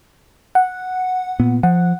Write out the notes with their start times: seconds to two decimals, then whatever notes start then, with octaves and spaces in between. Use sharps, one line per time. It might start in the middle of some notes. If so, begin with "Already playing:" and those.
0.55 F#5
1.40 A#2 B3
1.63 F3 F#5